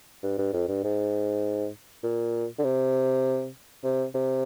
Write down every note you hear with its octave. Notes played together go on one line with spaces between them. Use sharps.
G2
G2
F2
G2
G#2
A#2
D3
C3
C3
C3